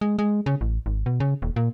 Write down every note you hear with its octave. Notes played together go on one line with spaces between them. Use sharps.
G#3
G#3
C#3
A1
G#1
B2
C#3
D#1
A#2